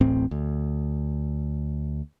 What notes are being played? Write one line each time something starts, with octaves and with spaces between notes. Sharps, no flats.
D1 A1 A2 C4
D2